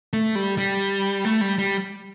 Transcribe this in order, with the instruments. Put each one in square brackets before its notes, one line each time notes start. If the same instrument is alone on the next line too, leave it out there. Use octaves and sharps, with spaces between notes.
[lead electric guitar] A3
G3
G3
A3
G3
G3